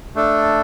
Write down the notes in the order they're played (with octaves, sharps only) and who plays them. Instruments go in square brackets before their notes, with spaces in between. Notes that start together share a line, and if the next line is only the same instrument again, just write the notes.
[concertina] A3 D4 A4